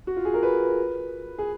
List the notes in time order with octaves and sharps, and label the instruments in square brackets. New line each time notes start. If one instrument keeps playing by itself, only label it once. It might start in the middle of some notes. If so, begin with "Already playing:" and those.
[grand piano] F#4
F4
G#4
A#4
B4
G#4